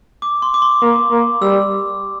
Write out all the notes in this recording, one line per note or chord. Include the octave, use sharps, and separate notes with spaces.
D6
C6
D6
C6
A#3
A#3
G3 E6